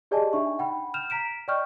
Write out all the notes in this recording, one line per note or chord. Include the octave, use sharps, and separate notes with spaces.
G4 G#4 D5 D#5 G#5 A5
D4 D#4 E5 C#6
F#5 G5 B5
F6 G6 E7 F7
A#5 B6 D7 E7
D5 D#5 G5 C#6 F6 G6